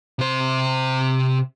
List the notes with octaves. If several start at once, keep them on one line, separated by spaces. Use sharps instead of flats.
C3 C5